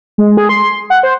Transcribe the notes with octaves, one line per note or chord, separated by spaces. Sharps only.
G#3
G#4
C6
F#5
C5